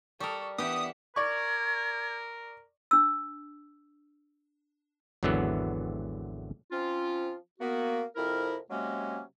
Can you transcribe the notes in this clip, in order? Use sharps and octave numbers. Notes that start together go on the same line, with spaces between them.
G3 A4 A#4 C#6 D#6
E3 B3 D4 G4 E5 F#5 D#6
A#4 D5 C#6 G#6
D4 E6
G#1 E2 D3 E3 F#3 B3
F3 C4 C#4 F4
A#3 B3 F#4
F2 C3 E4 A#4
C3 F#3 G#3 A#3 C#4